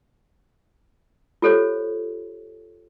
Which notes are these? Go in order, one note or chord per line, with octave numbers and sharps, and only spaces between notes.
F4 G4 A4 C5 C#5